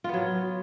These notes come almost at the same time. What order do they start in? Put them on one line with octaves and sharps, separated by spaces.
F4 B3 F#3